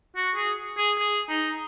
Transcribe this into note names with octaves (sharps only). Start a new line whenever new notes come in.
F#4
G#4
G#4
G#4
D#4